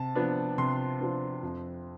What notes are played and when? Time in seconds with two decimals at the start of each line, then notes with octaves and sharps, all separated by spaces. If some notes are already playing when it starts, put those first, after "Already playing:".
Already playing: C3 A5
0.15 F3 B3 D4
0.58 C3 C6
1.00 F3 B3 D4
1.43 F2